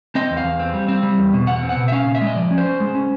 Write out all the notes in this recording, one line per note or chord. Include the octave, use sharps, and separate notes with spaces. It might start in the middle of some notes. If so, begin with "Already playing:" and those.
C4 D#5
E2
F5
E2
C4
G3
C4
G3
E2
B2
E2 F#5
C4
F#5
B2
E5
C#4 F5
A#2
E5
G#3
D#5
F3 D5
C#4
C5
C#4
G#3
C#4